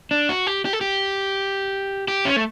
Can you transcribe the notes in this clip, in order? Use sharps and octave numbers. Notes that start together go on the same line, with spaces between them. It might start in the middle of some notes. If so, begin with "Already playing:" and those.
D4
F#4
G4
G4
A4
G4
G4
C#4
A3